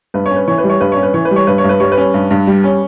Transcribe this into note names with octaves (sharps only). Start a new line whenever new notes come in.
G2 B4
C#5
C#4
B4
E3 C#5
B4
G3
C#5
G2 B4
C#5
C#4
B4
E3 C#5
B4
G3
C#5
G2 B4
C#5
G2
B4
G3 C#5
B4
C#4
G2
G2
G3
C#4